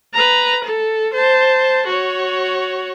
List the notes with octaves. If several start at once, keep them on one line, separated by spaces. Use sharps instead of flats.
B4 A#5
A4
C5 A5
F#4 C#5